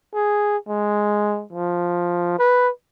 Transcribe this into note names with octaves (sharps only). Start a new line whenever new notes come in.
G#4
G#3
F3
B4